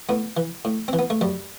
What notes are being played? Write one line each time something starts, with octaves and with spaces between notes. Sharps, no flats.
A2 B3
E3
A2
E3 C4
B3
A3
F#2 G3